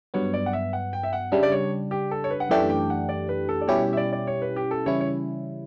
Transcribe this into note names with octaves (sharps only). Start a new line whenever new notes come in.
G2 F#3 B3 C#5
D5
F#5
E5
F#5
G5
E5
F#5
C#3 G3 D4 E5
D5
C#5
G4
A4
C#5
B4
F#5
F#2 E3 A3 D4 G4 E5
G5
F#5
D5
B4
A4
D5
B2 G3 C#4 E4 G4 C#5
E5
E5
D5
D5
C#5
B4
G4
A4
C#3 E3 G3 C#4 E4 C#5
C#5